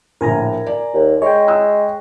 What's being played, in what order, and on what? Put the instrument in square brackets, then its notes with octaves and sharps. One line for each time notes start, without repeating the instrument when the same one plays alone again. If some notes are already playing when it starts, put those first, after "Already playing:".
[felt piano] A#1 A2 [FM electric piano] A#4 G#5 A#5
[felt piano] D5
[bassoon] D#2
[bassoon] G#3 [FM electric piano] C#5 G5
[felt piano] D#6 E6 F#6